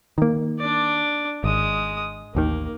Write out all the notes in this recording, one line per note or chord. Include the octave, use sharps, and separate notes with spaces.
D#3 A#3
D4 D5
G#1 G#3 D#6
A1 D#2 D#3 A#3